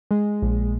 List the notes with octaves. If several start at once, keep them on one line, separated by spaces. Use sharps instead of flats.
G#3
A#1